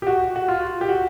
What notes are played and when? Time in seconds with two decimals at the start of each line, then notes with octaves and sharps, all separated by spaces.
0.02 G4
0.07 F#4
0.36 F#4
0.48 F4
0.81 G4
0.89 F#4